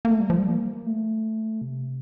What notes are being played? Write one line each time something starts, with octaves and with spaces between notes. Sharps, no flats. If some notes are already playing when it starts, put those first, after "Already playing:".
A#3
A3
G3
F3
G3
A#3
A3
C3